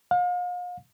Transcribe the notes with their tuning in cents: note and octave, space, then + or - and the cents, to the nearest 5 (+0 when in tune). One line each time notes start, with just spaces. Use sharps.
F5 +40